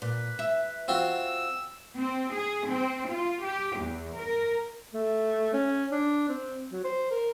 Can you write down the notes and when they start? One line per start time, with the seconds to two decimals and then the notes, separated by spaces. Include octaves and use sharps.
0.02 A#2 B4
0.39 E5
0.88 C4 F4 F#4 E6
1.97 C4
2.32 G#4
2.67 C4
3.10 F4
3.42 G4
3.77 E2
4.18 A#4
4.94 A3
5.53 C#4
5.92 D4
6.29 C4
6.72 F#3
6.84 C5
7.11 A#4